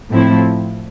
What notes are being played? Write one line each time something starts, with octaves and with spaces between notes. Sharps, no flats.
A2 F3 C4 E4